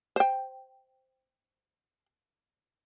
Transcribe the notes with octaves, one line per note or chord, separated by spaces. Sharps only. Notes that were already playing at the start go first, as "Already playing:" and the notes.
C5 G5